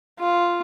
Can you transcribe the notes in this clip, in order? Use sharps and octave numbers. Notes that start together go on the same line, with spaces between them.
F4